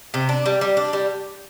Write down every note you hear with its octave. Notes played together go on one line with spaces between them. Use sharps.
C3
D4
G3
G3
D4
G3